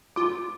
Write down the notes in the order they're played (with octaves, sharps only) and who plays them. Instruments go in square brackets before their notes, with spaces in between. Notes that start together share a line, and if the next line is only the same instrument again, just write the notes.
[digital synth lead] F4 [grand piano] D6